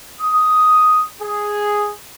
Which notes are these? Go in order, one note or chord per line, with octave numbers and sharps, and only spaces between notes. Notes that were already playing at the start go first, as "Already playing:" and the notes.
D#6
G#4